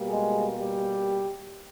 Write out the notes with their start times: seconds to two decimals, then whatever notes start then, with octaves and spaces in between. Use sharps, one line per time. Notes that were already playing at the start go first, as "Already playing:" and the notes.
Already playing: B2 G3 A#3
0.09 G#3 G#4
0.60 G3 G4